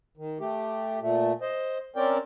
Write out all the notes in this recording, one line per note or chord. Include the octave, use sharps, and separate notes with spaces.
D#3
A3 G4
A#2 A3
C5 D#5
C4 C#4 A#4 D5 G5